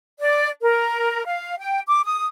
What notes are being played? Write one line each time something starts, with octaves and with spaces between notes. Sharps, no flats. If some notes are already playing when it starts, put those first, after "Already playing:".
D5
A#4
F5
G5
D6
D#6